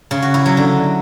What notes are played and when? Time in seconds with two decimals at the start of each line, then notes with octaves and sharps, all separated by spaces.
0.11 C#3
0.22 F#4
0.34 E4
0.46 F#3
0.57 D3